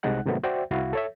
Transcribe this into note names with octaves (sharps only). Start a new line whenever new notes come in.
C2 C3 G#3 D#4 F#5 F#6
G#2 C3 D#3 F#3 A3 B3
F#4 C5 D5 E5 G5
C2 E4 F#4 F5
A4 C#5 E5